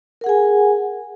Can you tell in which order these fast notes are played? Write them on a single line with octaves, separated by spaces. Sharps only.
A#4 F#5 G#4 G#5